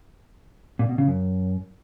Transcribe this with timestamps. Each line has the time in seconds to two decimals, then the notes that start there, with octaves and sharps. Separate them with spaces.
0.79 A#2
0.89 B2
0.98 C#3
1.08 F#2